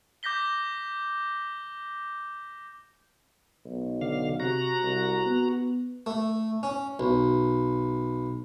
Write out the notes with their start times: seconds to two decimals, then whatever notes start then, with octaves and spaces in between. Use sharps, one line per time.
0.23 D6 G6 A#6 B6 G7
3.65 B1
4.01 D3 F5
4.40 C3 F#4 A#5
4.83 C2
5.25 B3
6.06 A3
6.63 C#4
7.00 B1